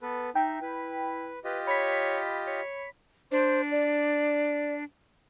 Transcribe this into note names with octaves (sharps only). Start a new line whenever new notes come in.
B3 A4 B4
D#4 E5 G5
E4 B4
F4 G4 B4 D#5
C#5 B5 B6
C#5
D4 C5
D5